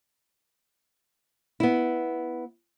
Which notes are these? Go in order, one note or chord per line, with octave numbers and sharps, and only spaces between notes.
B3 E4